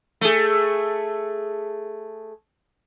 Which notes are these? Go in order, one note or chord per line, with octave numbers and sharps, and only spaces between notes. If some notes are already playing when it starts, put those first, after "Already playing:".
A3 G#4